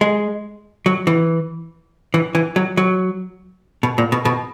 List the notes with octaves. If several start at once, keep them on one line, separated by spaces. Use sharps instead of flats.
G#3
F#3
E3
E3
E3
F#3
F#3
B2
A#2
B2
B2